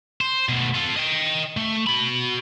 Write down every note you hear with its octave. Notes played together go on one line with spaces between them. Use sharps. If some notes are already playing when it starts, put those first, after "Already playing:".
C5
B2 A3
F4 A4
D#5 G5
A3
F#4 B5